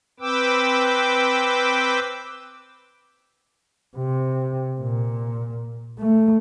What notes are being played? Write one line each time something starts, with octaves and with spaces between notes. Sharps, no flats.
C4 B4 G5 D6 E6
C3
A#2
A3